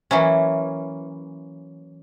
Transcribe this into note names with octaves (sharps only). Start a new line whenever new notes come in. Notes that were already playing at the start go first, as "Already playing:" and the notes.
E3 F#3 A#3 C#4